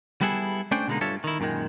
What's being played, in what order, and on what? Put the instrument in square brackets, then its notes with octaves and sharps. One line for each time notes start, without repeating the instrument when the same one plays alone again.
[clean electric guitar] G3 B3 E4 G#4 A4
A3 C#4 D4 C5 D5 G5
B2 D3 G3 G#3 A#3 D#4
G2 F4 A4 C#5 E5
D#3 E4
F#2 A#2 D3 D#3 G#3